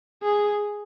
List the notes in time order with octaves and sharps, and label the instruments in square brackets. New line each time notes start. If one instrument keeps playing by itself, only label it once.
[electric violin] G#4